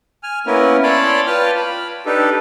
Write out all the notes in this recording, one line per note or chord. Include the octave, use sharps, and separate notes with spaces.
G#5 F6
A#3 B3 C#4 E4 A#4 B4
C#5 D5 A5 B5 C6 D6
F4 B4 G5 A5 F6
B5
D4 D#4 G4 A4 B4